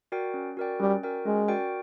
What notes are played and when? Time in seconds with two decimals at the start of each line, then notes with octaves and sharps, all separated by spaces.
0.12 F#4 A#4 D5 G5
0.34 C#4
0.57 F#4 A#4 D5 G5
0.80 G3 C#4
1.03 F#4 A#4 D5 G5
1.25 G#3 C#4
1.48 F#4 A#4 D5 G5